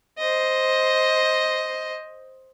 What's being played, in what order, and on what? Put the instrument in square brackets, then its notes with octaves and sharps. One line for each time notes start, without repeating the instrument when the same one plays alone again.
[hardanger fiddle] C5 D#5